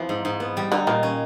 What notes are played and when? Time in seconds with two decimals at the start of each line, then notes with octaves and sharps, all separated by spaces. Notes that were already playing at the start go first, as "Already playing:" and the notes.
Already playing: F2 E3 F3 B3
0.09 G#2
0.25 G#2
0.40 B3
0.57 G3
0.72 D3 D#4
0.87 A#2 D#3
1.03 C#4